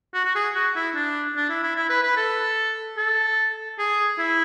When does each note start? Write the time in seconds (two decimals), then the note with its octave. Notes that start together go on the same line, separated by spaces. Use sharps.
0.14 F#4
0.25 F#4
0.35 G#4
0.55 F#4
0.76 E4
0.95 D4
1.36 D4
1.50 E4
1.63 E4
1.76 E4
1.89 B4
2.03 B4
2.17 A4
2.97 A4
3.79 G#4
4.19 E4